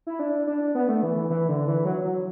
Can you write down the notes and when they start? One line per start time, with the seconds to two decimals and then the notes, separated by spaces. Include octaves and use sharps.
0.07 E4
0.19 D4
0.47 D4
0.75 B3
0.89 A3
1.03 E3
1.16 E3
1.30 E3
1.48 D3
1.67 E3
1.85 F#3
2.04 F#3